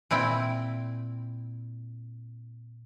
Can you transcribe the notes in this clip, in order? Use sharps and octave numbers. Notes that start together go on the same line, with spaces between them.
A#2 C4 E4 G5